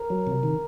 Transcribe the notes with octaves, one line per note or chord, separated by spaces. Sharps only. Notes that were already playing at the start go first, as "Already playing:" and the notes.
Already playing: A#4
F#3
C3
D#3